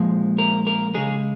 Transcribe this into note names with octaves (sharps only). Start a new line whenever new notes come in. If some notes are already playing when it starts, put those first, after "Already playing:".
Already playing: A#2 F3 G#3
A#4
A#4
C#3 G#3 G#4